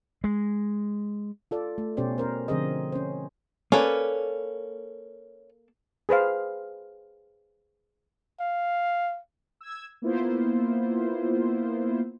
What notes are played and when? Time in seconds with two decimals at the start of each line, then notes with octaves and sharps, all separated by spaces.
0.24 G#3
1.51 F4 A4 D5
1.78 A3
1.97 B2 C#4 G4 C5 D5
2.18 C#4 A#4 C5
2.48 D3 F3 C4 G#4 C5 D#5
2.92 C#4 C5
3.72 A#3 C#4 A4 B4 D5
6.09 G#4 B4 C5 F5
8.40 F5
9.61 E6 G#6
10.02 A#3 B3 E4 F4 C5